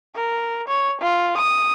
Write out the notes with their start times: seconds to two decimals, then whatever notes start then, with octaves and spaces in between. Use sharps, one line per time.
0.15 A#4
0.68 C#5
1.01 F4
1.37 D#6